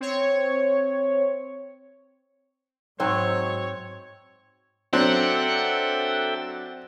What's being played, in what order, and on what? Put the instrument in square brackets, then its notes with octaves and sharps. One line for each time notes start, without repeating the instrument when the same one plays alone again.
[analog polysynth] C4 C#5
[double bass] G#2 [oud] F#3 D#4 C5 [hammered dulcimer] C4 [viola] C#5
[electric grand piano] F#3 D4 [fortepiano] C4 [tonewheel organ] A4 E5 G5 [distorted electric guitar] F#5